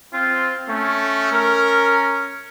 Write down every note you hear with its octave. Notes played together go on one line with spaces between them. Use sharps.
C4 F4
A3 C#4
A#4